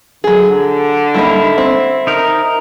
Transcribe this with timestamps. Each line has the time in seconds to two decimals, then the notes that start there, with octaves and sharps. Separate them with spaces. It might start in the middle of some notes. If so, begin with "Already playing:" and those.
0.24 D3 F#3 G#4
1.14 G3 A#3 D#4 E4
1.58 C4
2.07 D#4 A#4